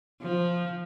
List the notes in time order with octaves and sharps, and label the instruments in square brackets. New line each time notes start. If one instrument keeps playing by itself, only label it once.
[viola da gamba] F3